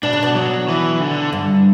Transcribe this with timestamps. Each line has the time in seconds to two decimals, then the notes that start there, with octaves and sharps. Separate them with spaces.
0.03 B2 D4
0.13 C#3
0.23 B2
0.35 F#3
0.68 E3
1.00 D3
1.33 G2